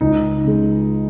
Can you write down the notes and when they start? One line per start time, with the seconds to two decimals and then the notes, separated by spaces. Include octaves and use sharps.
0.01 C#2 D#4
0.44 C#3 G#3